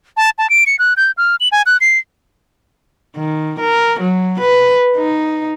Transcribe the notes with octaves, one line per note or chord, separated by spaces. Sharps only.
A5
A5
D7
C#7
F#6
G6
F6
F#7
G#5
F#6
C7
D#3
A#4
F#3
B4
D#4